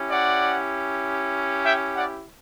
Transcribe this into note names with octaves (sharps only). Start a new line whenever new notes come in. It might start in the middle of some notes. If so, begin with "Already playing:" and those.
Already playing: C#4 E4 G4
D5 F#5
E5 G5
D5 F#5